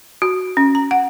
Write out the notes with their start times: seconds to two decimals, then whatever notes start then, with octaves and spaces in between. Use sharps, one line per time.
0.22 F#4
0.57 C#4
0.75 A#5
0.91 F#5